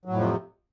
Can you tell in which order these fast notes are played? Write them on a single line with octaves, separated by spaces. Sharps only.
F#3 A2 F2 F3 C3